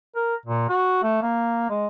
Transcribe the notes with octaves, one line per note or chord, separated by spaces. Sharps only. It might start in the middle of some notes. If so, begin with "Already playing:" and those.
A#4
A#2
F#4
A3
A#3
G#3